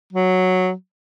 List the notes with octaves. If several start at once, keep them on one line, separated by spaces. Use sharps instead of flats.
F#3